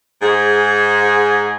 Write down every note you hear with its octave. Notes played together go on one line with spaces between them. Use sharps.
G#2 G#4